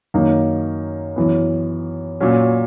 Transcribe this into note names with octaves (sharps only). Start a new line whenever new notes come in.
F#2 D#3 A#3 D#4
F#2 E3 B3
A#2 F#3 C#4